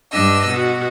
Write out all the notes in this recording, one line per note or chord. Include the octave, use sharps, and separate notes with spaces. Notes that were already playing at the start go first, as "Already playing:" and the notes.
G2 D4 D#5 E6
B2 F#4